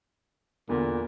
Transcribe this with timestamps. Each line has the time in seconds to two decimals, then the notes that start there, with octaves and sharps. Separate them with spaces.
0.69 E2 A#2 D3